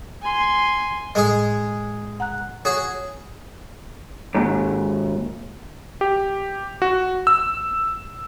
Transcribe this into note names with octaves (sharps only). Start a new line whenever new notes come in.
G#5 C6
A2 G#3 G#4 D#5
F#5 A#5 F#6
F#4 G#4 C#5
D#2 G#2
G4
F#4
E6